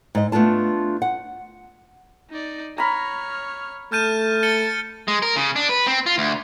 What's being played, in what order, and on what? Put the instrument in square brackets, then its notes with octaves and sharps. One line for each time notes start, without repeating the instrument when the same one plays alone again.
[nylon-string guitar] G#2 D#5
A3 B3 D4 F4 A5
F#5
[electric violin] D#4 D5
[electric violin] C#5 F6 [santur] A#5 B5
[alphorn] A3 [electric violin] A5 [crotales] F6 G6 D#7
[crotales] A6 C#7 G7
[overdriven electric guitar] G#3
A#4
C#3
D4
B4
C4
F4
D2